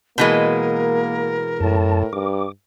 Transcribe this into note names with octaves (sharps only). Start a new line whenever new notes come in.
B2 E3 G#3 A#3 A#4
F#2 A2 A5
G2 D6